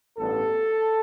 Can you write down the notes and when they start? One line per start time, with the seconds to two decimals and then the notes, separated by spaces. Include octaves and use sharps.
0.17 A1 G2 G3 B3 A4